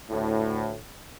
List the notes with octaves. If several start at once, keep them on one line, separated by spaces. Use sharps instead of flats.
D2 A2